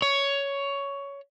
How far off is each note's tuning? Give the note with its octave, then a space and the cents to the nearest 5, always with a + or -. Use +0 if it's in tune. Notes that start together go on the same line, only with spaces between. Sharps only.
C#5 +10